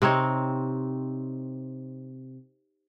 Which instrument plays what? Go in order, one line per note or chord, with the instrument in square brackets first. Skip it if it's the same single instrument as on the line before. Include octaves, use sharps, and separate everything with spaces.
[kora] C3 C4 D#4 C#5